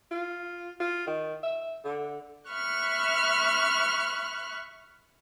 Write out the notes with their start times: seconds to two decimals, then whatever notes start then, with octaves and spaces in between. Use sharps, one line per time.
0.11 F4
0.80 F4
1.07 D#3
1.43 E5
1.85 D3
2.49 E5 B5 C#6 F6 F#6